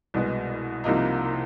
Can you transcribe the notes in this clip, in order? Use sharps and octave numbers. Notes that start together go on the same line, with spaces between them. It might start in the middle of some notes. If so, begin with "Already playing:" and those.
C2 B2 G#3 B3
C2 C3 F3 A#3 D#4